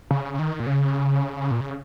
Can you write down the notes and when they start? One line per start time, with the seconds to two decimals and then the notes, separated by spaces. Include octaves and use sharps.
0.11 C#3
0.39 D#3
0.60 A#2
0.67 C#3
1.51 A#2
1.61 C#3